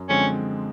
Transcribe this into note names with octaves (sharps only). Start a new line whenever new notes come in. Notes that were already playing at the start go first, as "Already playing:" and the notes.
Already playing: F#2
D3 F3 G#3 C4 C#4